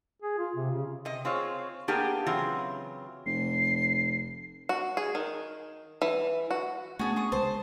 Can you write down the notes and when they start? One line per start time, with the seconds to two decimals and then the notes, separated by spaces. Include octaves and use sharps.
0.22 G#4
0.38 F4
0.56 C3
0.71 C#3
1.05 C3 D#5
1.25 C4 F4 G#4 C#5
1.88 A#3 B3 D4 G4 G#4
2.26 C#3 E3 F#3 C4 F4 G#4
3.26 F1 C7
4.69 F#4
4.97 G#4
5.15 D#3
6.02 E3
6.51 F#4
6.99 A3 B3 C#4 D4 F#4 G#4 A5
7.16 G#4 C#6 D#6
7.32 C#2 G#3 C5 A5